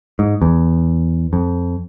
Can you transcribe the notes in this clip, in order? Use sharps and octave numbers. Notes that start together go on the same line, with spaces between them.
G#2
E2
F2